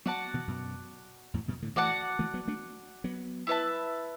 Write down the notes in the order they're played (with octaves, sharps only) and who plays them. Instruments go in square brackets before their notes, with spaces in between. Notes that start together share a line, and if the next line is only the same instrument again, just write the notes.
[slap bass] F#3 B3 [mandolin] F#4 D5 F#5 A5
[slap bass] B2 E3
F#2 B2
E2 A2
F#2 B2
A2 D3
[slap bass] E3 A3 [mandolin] F#4 D5 F#5 A5
[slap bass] E3 A3
F#3 B3
A3 D4
F#3 B3
[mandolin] E4 B4 E5 A5